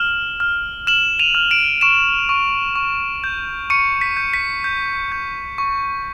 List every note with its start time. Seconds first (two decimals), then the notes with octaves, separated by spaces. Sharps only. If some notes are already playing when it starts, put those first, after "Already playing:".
Already playing: F6 E7 F#7
0.40 F6
0.87 F6 E7 F#7
1.19 D#7 F7
1.35 F6
1.51 D7 E7
1.81 C#6 D7 E7
2.29 C#6
2.76 C#6
3.24 G6
3.70 C#6 C#7 D#7
4.01 B6
4.17 G6
4.34 B6
4.64 G6
5.12 G6
5.58 C#6